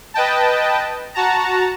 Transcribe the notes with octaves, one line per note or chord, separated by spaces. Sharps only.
B4 D#5 G5 A5
F#4 A5 A#5